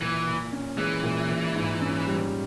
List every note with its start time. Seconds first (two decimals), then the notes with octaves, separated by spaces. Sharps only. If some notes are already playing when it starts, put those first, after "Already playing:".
0.01 A#2 E3
0.27 A#2
0.52 C#4
0.77 E3 G#3
1.04 A#2
1.29 A#2
1.55 G#2
1.81 C#4
2.07 G3